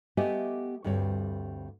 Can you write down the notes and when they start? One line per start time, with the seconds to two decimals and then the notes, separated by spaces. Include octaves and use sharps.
0.17 A3 B3 G4 D#5 E5 G#5
0.84 D2 G2 G3 C4 C#5